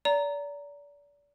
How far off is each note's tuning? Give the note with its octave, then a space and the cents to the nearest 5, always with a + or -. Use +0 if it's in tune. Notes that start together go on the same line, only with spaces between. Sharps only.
D5 -30 A#5 -10